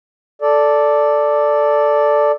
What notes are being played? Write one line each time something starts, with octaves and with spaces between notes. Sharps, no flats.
A4 D5